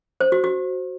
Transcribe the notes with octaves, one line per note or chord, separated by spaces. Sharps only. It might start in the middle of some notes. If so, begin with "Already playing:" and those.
C5
F#4
F#4